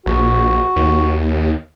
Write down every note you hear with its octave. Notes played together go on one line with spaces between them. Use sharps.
A#1 F#4
D#2